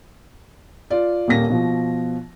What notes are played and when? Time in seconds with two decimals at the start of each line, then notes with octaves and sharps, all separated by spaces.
0.90 F4 D5
1.28 D#1 A#3 A#6
1.50 B2 F3